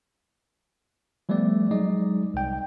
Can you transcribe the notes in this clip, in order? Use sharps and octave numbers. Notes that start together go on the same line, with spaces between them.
F3 G3 A3 B3 D5
F#3 G#3 D#4 D5 D#5
C2 G5